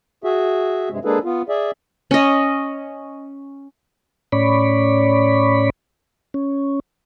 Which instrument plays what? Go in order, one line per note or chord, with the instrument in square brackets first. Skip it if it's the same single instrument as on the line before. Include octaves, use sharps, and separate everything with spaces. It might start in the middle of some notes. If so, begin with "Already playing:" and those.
[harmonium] F#4 G#4 E5
G2 C3 G#3
G#3 A#3 D4 G#4 A4 B4
B3 F4
G#4 D5 E5
[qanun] C#4 D#5
[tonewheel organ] A2 C#4 C#5 D5 B5
C#4